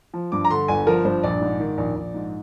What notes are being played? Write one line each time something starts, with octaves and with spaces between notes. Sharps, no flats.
F3
G2 D6
A#5
D3 C6
G1 G#5
F3 A#4
G2 C5
A#1 D5
G#2
D#3
A#1
A#1
G#2